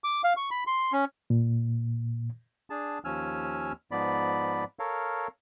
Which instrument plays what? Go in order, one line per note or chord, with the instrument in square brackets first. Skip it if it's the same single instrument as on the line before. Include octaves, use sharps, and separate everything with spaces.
[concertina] D6
F5
C#6
B5
C6
C#4
[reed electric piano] A#2
[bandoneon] D4 G#4 A5
D#2 F3 C#4 G#5 E6 F6
G#2 F3 B3 D5 B5
A4 A#4 C#5 F5